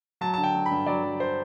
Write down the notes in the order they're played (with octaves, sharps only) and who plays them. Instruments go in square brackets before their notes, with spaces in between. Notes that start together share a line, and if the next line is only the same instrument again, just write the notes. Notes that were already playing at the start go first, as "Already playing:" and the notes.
[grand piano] F#3 A5
D3 A5
G5
F#3
B5
G2
F#3 D5
F#3
C5